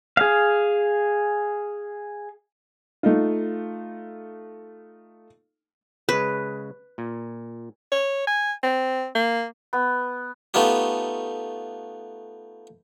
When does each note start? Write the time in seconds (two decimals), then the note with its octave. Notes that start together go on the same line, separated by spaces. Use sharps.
0.17 G#4 F5
3.03 A3 D#4 F4
6.09 C#3 G#3 B4
6.98 A#2
7.92 C#5
8.27 G#5
8.63 C4
9.15 A#3
9.73 B3
10.54 A3 B3 D#4 F4 G4